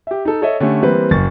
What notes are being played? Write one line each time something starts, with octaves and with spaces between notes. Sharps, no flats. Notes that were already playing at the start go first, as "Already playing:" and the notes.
G4 E5
D#4 A4
A4 C#5 D#5 E5
D3 A3 C#4 G4
E3 G3 A#3 C4 B4
F#1 C#6 A6